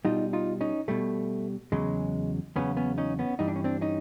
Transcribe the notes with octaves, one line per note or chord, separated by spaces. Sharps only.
B2 G3 D#4 F4
D#4 F4
C#4 D#4
B2 G3 A3
E2 C#3 F#3 G#3
E2 C#3 F#3 B3 C#4
B3 C#4
C#4 D#4
B3 C#4
G2 E3 G3 D#4
D4
C#4
C4 D4
C#4 D#4